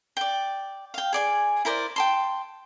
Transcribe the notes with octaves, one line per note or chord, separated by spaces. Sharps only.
D5 G5
F5 G5
G#4 D5 G#5
E4 A#4 C5 D5
G5 A5 C6